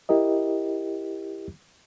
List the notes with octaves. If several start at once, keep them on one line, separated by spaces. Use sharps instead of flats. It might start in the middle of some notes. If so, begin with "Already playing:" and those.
E4 G4 A#4 D#5